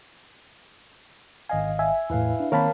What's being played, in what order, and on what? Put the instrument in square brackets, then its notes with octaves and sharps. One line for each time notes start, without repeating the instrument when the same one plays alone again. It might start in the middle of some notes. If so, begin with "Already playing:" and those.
[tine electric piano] G#1 D#5 F5 [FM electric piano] G#5
[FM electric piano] E5 G#5
[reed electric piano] E2 A2 [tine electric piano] E4 B4 F5
[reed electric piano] D4
[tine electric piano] D#3 A#3 C4 [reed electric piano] A#4 F5 A5 [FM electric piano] C#5 B5